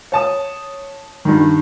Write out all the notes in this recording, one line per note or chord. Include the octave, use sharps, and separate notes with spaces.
C#5 A5 D#6
G2 D#3